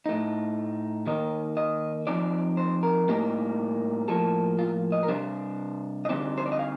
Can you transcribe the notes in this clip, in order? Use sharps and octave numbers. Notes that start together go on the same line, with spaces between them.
A2 A3 D#4
D#3 A#3 D#4 D#5
D#5
F3 C4 D#4 D5
C5
A#4
A2 G3 A#3 D#4
A2 F3 A#3 A4
F4
D#5
A#4
C3 G3 D4 C5
D#5
D3 G3 C4 D#4 D5
C5
D5
D#5
F5